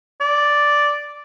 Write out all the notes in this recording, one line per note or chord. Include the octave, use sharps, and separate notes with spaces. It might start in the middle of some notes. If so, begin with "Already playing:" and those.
D5